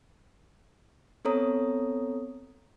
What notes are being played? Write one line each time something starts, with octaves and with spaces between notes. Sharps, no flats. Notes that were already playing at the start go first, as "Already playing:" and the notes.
B3 C4 A4 C#5 A#5 D#6